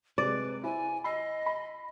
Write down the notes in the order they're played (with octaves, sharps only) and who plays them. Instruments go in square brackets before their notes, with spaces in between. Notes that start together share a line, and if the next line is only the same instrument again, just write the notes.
[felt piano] C3 G#3 [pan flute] B4 [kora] D5
[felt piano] E4 C5 [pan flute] G#5
[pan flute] D#5 [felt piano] B5 E6 C7
[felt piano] B5